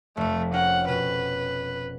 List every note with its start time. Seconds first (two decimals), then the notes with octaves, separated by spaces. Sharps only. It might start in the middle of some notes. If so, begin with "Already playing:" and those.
0.17 F1 F2 A3
0.53 C#4 A#4 F#5 G5
0.88 B2 B4